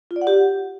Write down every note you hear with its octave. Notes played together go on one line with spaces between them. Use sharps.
F4
D5
F#5
G4